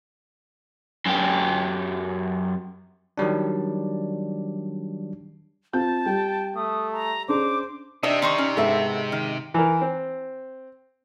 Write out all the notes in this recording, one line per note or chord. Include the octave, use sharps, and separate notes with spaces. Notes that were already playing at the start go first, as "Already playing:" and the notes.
F#2 G4
D#3 F#3 G3 D4
C4 F4 A5 G6
G3 G5
A3 D#6
A#5
C#4 D4 G#4 C5 D6
C3 D4 D#5 E5
D#3 D#4 C6 C#6
C#4
G#2 B3 A4 E5
D#3
E3 A#4
C4